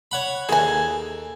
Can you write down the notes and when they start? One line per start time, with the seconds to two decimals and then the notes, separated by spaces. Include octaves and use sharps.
0.11 C#5 F#5 B5
0.49 D#2 G#4 A4 G#5